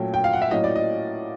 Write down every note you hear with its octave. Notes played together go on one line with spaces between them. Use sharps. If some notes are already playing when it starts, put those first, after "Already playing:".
Already playing: A#2 F#3 A3 C#4 G5
G5
F5
F#5
E5
A2 F#3 A#3 C#4 D#5
D5
D#5